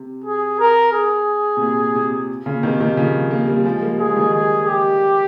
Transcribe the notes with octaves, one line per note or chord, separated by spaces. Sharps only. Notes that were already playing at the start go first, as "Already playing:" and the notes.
Already playing: C3
G#4
A#4
G#4
C3
A#2
C3
A#2 C#3
C3 D#3
C3 D#3
C#3 F3
A#3
G3 A#3
G3
F3 G#3
G3 A#3
F3 G#3 G#4
G#3
D#3 G3
G#4
G4